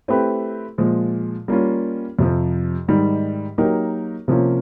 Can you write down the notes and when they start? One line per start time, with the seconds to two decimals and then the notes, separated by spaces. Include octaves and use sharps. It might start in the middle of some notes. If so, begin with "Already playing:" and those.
0.08 A3 C4 E4 G4 B4
0.78 A#2 F3 G#3
1.48 G3 A#3 C#4 F4
2.19 F2 C3 F3
2.88 G#2 D#3 G3
3.58 F#3 A#3 D#4 G4 A#4
4.28 C3 F3 A#3 C#4 F4